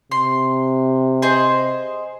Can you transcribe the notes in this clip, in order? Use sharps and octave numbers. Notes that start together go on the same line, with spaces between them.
C3 C6
G#4 C5 D#5